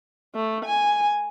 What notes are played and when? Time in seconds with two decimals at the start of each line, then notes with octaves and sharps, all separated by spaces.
0.35 A3
0.66 G#5